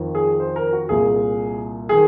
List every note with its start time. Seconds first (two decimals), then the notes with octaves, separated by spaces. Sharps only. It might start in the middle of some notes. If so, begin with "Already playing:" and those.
Already playing: F2 D#3
0.15 G#4
0.40 C5
0.56 A#4
0.73 F#4
0.89 C2 A#2 G#4
1.89 D#3 G#4